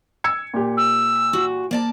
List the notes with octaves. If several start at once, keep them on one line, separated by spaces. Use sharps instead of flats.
E6 G#6 C#7
A#2 G4
E6
F#4
A#3 D5 A5